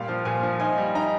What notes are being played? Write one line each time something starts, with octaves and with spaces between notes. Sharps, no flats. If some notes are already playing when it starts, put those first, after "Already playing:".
Already playing: A#2 G3 F5
F3
A#2 G#5
F3
D#4 G#5
G3
D#4 A#5